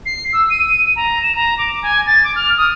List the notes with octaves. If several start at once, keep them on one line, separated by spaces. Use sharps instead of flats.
C7
E6
D#7
A#5
E7
A#5
D6
G#5
A6
D6
F6
D#6